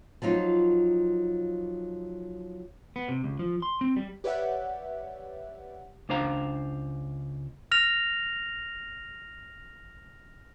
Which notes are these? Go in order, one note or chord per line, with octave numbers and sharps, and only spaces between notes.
F3 F#3 D#4 F4
B3
C3
C#2
F3
C6
C4
G3
G4 B4 C#5 D5 E5 F#5
C#2 D4 C5 F5 A#5
F6 A#6 F7